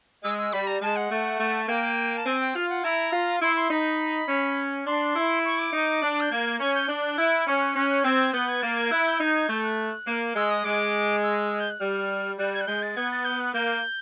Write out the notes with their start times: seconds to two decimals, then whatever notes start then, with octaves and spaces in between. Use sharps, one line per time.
0.24 G#3 E6
0.38 E6
0.53 G3 B5
0.67 A#5
0.82 G#3 A5
0.96 F#5
1.11 A3
1.40 A3
1.68 A#3 G5
2.17 A5
2.26 C4 G#5
2.40 G5
2.55 F4 F5
2.70 F#5
2.84 E4 A#5
3.13 F4
3.42 E4 C6
3.56 C6
3.70 D#4 B5
4.29 C#4
4.87 D4 C6
5.16 E4
5.45 C#6
5.59 D6
5.73 D#4
6.02 D4
6.21 G6
6.31 A#3 G#6
6.60 C#4 G#6
6.75 G6
6.89 D4 F#6
7.18 E4
7.47 C#4 F6
7.62 F#6
7.76 C#4 F#6
7.90 F#6
8.05 C4 G#6
8.33 B3 G6
8.48 G#6
8.62 A#3 A6
8.77 G#6
8.91 E4 F#6
9.06 G6
9.20 D#4 G#6
9.35 G#6
9.49 A3 G6
9.64 F#6
10.07 A#3
10.36 G#3 E6
10.51 D#6
10.64 G#3 D6
11.23 E6
11.60 G6
11.70 F#6
11.80 G3 F6
12.38 G3 F#6
12.54 G#6
12.61 F#6
12.67 G#3 G6
12.82 A6
12.97 B3 G#6
13.11 A6
13.25 G6
13.40 F#6
13.54 A#3 G6